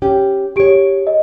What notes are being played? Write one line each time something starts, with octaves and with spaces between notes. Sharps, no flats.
C#4 G4
G4 G#4 C#5 D7
D#5